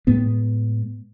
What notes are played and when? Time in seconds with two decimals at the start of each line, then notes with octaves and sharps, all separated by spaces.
0.07 A2 G#3 B3